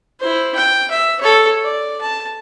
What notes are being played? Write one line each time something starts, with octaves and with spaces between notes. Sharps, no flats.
E4 C5
G5
E5
A4 C#5
D5
A5